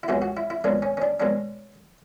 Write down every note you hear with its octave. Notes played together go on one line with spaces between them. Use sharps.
E4
C#2 B2 G#3 C#4 F#4
F#4
E4
E4
C#2 B2 G#3 C#4 D4
C#4
C#4
D4
B2 G#3 C#4 D4